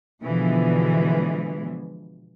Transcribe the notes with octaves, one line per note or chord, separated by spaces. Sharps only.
B2 D3 E3 F3 G#3